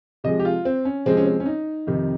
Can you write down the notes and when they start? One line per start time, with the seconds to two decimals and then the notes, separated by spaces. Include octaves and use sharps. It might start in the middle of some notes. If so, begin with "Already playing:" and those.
0.24 C3 F3 G#3 D#5
0.40 G4
0.45 F4
0.65 C4
0.85 C#4
1.06 C3 F3 G#3 C4
1.17 C#4
1.26 C4
1.40 C#4
1.46 D#4
1.87 F2 C3 D#3